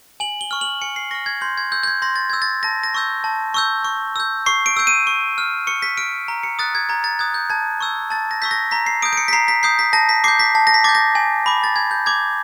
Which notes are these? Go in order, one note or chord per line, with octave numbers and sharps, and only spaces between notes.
G#5 F#7
G7
C#6 F6
F#7
G#5 C#7
C7
C#6 F6 A#6
G#6
C6 G6
G#6
E6 G6
G6
G#6
C6 A#6
A6
E6 G6 G#6
A6
A5 A#6
A#6
C#6 E6 G6
A5
C#6 E6 G6
C#6
E6 G6
C#6 C7
D7
E6 G6 D7
D#7
C#6
F6
C#6 C#7
B6
F6 D7
A#5
C#7
D#6 F#6 A6
G#6
A#5 G#6
A6
D#6 F#6 G#6
G6
A5 G#6
C#6 E6 G6
A5 A6
A#6
C#6 E6 G6 B6
A#6
A#5 B6
C7
D#6 G6 D7
D7
C#7
B6
A#5 C7
B6
D#6 G6 C7
B6
A5 A#6
B6
D6 G6 C7
B6
A5
A#6
B6
D6 G6 A6
A#6
G#5
B5 D6
A6
G#5 G#6
G6
B5 D6 G#6